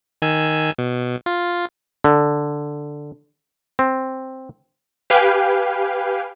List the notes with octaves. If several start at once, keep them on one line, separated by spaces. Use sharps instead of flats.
D#3 G#5 E6
B2
F4
D3
C4
G4 B4 F5 G5 G#5